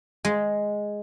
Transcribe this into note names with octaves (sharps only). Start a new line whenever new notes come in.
G#3